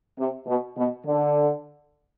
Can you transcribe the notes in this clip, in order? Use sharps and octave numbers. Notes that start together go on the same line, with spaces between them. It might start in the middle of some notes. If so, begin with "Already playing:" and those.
C3
B2
B2
D3